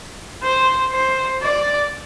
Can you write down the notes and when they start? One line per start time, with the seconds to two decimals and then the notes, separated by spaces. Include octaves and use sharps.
0.43 C5
0.92 C5
1.42 D5